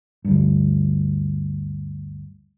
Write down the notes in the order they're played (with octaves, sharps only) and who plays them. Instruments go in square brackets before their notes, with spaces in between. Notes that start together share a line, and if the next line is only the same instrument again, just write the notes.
[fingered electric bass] D2 G2